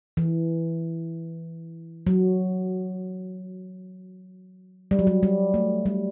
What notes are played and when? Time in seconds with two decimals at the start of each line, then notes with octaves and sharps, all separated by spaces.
0.17 E3
2.07 F#3
4.91 G3
4.99 F#3
5.07 G3
5.23 G3
5.54 A3
5.86 G3